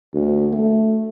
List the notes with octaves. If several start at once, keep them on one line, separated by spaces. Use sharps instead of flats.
D2
A3